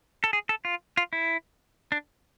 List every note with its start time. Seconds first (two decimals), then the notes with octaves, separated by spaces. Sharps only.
0.24 A4
0.33 G#4
0.49 A4
0.65 F4
0.97 F4
1.13 E4
1.92 D4